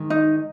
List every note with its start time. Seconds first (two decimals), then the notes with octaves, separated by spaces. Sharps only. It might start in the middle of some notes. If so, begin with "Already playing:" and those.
Already playing: G#2 D#3 G#3
0.10 D#4